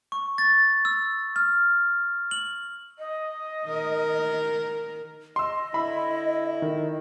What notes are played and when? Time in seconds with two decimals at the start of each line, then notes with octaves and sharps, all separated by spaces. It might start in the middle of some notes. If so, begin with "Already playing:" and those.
0.12 C#6
0.38 A6
0.85 E6
1.36 F6
2.31 F#7
2.99 D#5
3.66 D#3 A#4
5.36 D#5 C6 E6
5.74 D3 E4 B5 E6
6.62 D#3